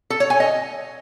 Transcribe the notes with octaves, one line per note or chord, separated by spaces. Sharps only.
A4
C#5
G#5
D#5